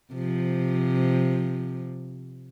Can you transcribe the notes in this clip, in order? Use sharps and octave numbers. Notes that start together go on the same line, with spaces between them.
C3 F3